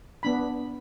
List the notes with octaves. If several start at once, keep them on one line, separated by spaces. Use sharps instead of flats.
B3 D4 B5